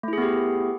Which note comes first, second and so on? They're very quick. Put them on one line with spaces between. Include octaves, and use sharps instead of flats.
A3 E4 G#4 B3 G4